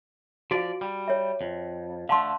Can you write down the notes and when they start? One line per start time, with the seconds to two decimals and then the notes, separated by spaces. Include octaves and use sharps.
0.51 F3 F#4 D5 F5
0.81 G3
1.08 C#5 E5
1.41 F2
2.09 D3 A3 F5 A5 C6